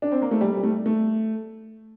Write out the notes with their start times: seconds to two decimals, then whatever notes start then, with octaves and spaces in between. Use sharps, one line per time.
0.02 D4
0.12 C4
0.22 A#3
0.31 A3
0.41 G3
0.57 G3
0.63 A3
0.86 A3